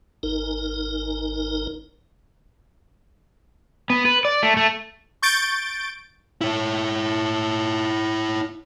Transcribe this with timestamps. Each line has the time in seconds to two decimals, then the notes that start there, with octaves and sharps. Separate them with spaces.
0.23 G#1 D#4 A#4
3.90 B3
4.05 B4
4.25 D5
4.43 A3
4.57 A3
5.22 C#6 G6 A6 D7
6.41 E4 C#5